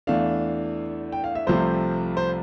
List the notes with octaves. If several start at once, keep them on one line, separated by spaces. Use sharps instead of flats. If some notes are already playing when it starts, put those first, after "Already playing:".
E2 E3 A3 D4 F5
G5
F5
E5
C2 C3 F3 A3 C5
C5